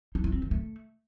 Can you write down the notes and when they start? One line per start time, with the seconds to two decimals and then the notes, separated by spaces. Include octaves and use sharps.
0.15 D#4
0.24 E4
0.33 C4
0.42 D#3
0.51 A3